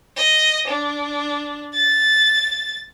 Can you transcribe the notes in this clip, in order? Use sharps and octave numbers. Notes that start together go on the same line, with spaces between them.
D#5
D4
A6